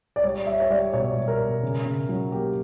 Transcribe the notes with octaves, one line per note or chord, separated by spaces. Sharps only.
D5
G3 C#5
G3 E5
C#5
G3 D5
B2 C#5
G3
A#4
B2
C#3
C#3
F#3
A#3 G4